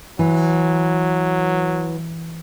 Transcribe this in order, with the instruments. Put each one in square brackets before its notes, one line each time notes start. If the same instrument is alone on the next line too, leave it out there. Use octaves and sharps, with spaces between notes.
[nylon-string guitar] E3 [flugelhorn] F#3